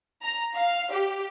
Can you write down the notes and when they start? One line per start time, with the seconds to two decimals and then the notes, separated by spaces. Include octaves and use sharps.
0.23 A#5
0.55 F5
0.92 G4